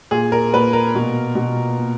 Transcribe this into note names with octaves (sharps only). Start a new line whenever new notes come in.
A#2 G#4
A#4
A#2 B4
A#4
B2
B2
A#2